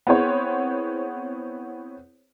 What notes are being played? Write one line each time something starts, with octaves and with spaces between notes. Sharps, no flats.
B3 C4 E4 G#4 C5 C#5